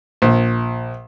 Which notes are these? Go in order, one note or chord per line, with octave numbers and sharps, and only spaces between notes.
A#1